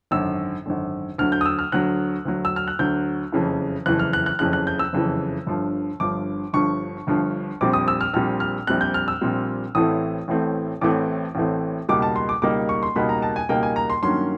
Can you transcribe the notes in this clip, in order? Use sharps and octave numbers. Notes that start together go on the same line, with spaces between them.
G#1 F#2 D3 E6
G#1 F#2 D3
D2 D3 F#3 F6
G6
D#6
E6
F6
D2 D3 F#3 F#6
D2 D3 F#3
E6
F6
F#6
D2 D3 F#3 G6
F#1 F2 C#3 E3
F#1 F2 C#3 E3 F#6
F6
F#6
F#6
F#1 F2 C#3 E3 F#6
F#6
G6
E6
F#1 F2 C#3 E3
G1 G2 D3 F3
G1 G2 D3 F3 D6
G1 G2 D3 F3 C#6
G1 G2 D3 F3
A#1 A#2 G3 C4 D6
D#6
E6
F6
A#1 A#2 G3 C4 F6
F6
A#1 A#2 G3 C4 F#6
G6
F6
E6
A#1 A#2 G3 C4
A1 A2 E3 A3 C4 D#6
A1 A2 E3 A3 C4
A1 A2 E3 A3 C4 D6
A1 A2 E3 A3 C4
C#2 B2 G3 A#3 D#4 D6
A5
C6
D6
C#2 B2 G3 A#3 D#4 D6
C#6
C6
C#2 B2 G3 A#3 D#4 B5
A#5
A5
G#5
C#2 B2 G3 A#3 D#4 G5
G#5
A#5
C6
G2 D#3 F#3 A#3 C#4 C6